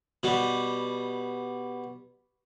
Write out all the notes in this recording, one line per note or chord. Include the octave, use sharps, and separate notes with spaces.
B2 G3